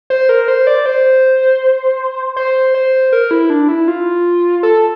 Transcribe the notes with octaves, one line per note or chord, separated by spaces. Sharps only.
C5
A#4
C5
D5
C5
C5
C5
A#4
E4
D4
E4
F4
A4